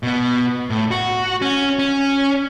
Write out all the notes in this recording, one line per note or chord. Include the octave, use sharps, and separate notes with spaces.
B2 B3
A2
F#4
C#4
C#4